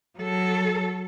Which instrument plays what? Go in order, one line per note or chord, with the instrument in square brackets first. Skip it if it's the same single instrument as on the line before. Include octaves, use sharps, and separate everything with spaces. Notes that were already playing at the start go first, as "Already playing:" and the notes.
[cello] F#3 A4